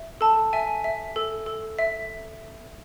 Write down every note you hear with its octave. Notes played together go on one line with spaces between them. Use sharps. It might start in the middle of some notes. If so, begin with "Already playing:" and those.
Already playing: E5
A4 A5
E5 G#5
E5
A4
A4
E5